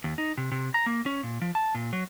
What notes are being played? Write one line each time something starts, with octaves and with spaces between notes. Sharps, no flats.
D#2
D#4
C3
C3
A#5
A#3
C#4
A#2
F3
A5
A#2
F#3